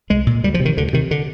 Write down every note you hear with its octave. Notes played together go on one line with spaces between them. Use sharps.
C2 G#3
A#2
D2 G3
F3
C3
D#3
D2 D3
C3 D#3
D3